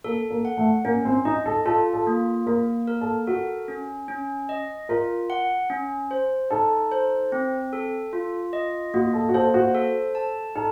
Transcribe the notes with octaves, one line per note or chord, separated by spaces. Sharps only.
A#3 A4
A#3
F#5
A3
A#3 C#4
C4
D#4 D#5
A4
F4 A4
A4
A#3
A#3 A#4
A#4
A4
F#4 A4
C#4
C#4
D#5
F4 A#4
F#5
C#4
C5
D#4 A4
C5
C4
A4
F4
D#5
A#3 F#4
A4
F#4
A4 C5
F#4
A4
A5
D#4 A4